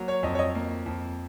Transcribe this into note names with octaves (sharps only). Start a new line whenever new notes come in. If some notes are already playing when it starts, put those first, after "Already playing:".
Already playing: F#3 A#3
C#5
F2 D#5
C#5
D#5
A#3
F2